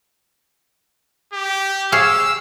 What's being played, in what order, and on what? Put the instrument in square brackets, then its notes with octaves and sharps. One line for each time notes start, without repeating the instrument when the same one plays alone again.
[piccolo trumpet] G4
[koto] G#4 C#5 F5 [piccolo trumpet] E6